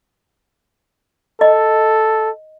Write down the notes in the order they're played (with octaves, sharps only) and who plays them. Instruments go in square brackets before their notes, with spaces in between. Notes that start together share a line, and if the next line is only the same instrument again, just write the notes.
[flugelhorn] A4 [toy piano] D#5